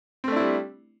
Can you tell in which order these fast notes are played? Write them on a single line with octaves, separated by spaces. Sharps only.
C4 A3 D4 E4 G3